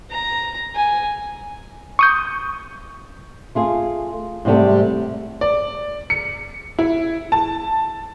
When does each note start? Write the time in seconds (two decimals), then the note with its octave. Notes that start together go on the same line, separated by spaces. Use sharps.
0.11 A#5
0.75 G#5
1.99 C#6 D#6 G6
3.55 A3 F4 G#4
4.45 G#2 C3 G3 A3
5.41 D5
6.10 C#7
6.79 E4
7.32 A5